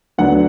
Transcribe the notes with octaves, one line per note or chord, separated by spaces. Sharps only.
D2 D3 F#3 B3 D4 F#5